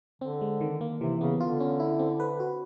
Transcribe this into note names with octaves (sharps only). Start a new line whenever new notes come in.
D3 C4
G#3
D#3
A#3
C3 E3
C#3 B3
D3 F4
C#4
E4
C4
B4
F#4